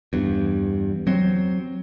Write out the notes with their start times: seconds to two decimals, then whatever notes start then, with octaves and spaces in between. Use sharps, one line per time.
0.13 E2 G2
1.07 F#3 C4